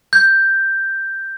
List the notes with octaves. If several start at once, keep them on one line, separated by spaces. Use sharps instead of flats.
G6